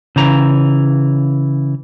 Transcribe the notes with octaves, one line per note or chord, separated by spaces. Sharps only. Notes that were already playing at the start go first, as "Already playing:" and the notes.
C#3 E3 A#5